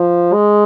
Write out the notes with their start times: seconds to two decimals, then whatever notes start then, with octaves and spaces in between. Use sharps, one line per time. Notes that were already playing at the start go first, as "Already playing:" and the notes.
Already playing: F3
0.33 G#3